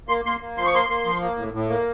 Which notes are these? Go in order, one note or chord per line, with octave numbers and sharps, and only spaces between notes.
A#3 C6
A#3 C6
A#3
F3 C6
C#6
A#3 C6
A#3
F3
A#3
A2
A2
A#3